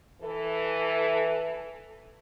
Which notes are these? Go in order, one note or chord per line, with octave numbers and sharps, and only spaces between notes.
E3 A4